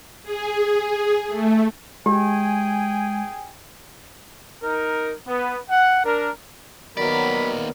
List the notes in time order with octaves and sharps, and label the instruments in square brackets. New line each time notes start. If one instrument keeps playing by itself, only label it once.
[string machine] G#4
A3
[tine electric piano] G#3 [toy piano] G4 [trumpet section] G#4 G5 G#5
[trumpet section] D#4 A#4
B3
F#5
D4 A#4
[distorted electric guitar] D#2 D5 [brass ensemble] D#3 F#3 [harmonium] B3 A#4 [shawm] B5